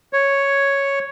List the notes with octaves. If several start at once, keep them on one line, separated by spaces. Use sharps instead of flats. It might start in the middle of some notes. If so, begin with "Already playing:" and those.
C#5